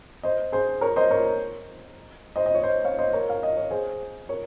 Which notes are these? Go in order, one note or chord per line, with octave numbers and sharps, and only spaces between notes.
C5 D#5
G#4 C5
A#4 C#5
C5 D#5
A#4 C#5
C5 D#5
D#5
C#5
C5 D#5
C#5 F5
C5 D#5
A#4 C#5
F5
D#5
C#5
G#4 C5
A#4 C#5